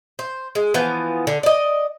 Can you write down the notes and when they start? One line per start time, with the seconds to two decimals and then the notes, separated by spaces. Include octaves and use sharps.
0.19 C5
0.55 G#3
0.74 E3 F3 B3
1.27 D3
1.43 D5 D#5